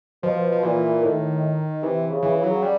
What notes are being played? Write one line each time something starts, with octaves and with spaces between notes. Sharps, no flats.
B2 F3
F3
A#2 E3
A2 D#3
C3 E3
C#3
E3
C#3
F#3
G3